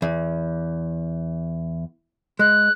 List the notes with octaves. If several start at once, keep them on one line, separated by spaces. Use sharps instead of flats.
E2
G#3 F#6